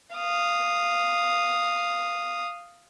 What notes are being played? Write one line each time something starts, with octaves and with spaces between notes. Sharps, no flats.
F5 D#6